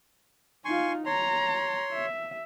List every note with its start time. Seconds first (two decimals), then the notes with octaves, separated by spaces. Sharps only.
0.65 D#4 F4 G#5 C6 C#6
1.06 C#5 A#5 C6
1.92 E5